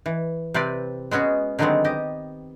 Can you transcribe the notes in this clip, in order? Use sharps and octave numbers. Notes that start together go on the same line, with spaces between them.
E3
C3 C4 B4 D5
G#3 B3 C#4 F#4 G#4
D3 D#3 F#3 G#3 B3 C4
G4 D#5